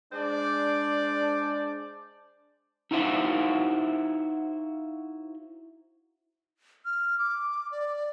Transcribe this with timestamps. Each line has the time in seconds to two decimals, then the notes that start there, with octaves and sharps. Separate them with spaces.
0.12 G#3 D4 C5 D5
2.91 D#4 E4 F#4 C5 E5 F5
6.85 F6
7.19 D6
7.72 D5